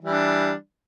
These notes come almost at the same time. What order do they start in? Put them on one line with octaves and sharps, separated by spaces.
E3 G3 D4